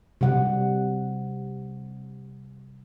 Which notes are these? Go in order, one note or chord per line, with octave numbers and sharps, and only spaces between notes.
C3 G3 F#5